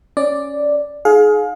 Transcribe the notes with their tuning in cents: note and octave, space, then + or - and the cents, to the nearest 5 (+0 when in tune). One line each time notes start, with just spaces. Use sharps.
C#4 +0 D5 +0
D#4 +0 G#4 +25 F5 +30